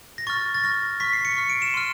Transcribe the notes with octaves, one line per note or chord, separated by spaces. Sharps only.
A#6
C#6 F6 A6
A6
C#6 F6 A#6
C#6 F6 B6
C7
C#7
C#6 F6 C7
D7
E7
C6 F6 D#7